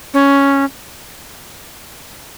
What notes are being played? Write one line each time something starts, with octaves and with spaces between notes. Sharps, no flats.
C#4